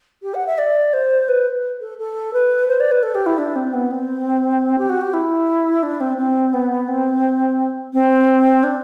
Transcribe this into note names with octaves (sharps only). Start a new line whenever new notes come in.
G4
F#5
E5
D5
C5
B4
A4
A4
B4
C5
D5
B4
A4
G4
E4
D4
C4
B3
C4
G4
F#4
G4
E4
D4
C4
C4
B3
C4
C4
D4